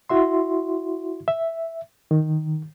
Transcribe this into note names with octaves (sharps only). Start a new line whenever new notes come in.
E4 F#4 E5 C6
E5
D#3